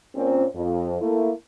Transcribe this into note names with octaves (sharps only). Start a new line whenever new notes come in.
A#2 C4 C#4
F2
A3 A#3 E4